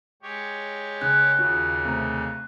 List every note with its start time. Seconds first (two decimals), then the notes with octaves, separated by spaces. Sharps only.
0.22 G#3 G4 C#5
1.01 C#3 C#4 F#6
1.38 D#2 C#3 C#4 F4 F#4
1.85 C3 A3 A#5